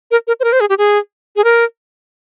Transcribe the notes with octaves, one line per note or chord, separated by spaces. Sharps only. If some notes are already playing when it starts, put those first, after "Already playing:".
A#4
A#4
C5
A#4
C5
G#4
G4
G#4
G#4
A#4